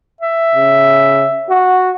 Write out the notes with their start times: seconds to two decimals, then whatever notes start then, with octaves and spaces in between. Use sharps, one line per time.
0.21 E5
0.55 C#3
1.49 F#4